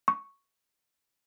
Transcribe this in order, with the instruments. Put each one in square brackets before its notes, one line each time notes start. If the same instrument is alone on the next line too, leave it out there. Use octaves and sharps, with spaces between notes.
[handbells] C#6